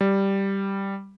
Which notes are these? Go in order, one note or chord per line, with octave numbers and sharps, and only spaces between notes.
G3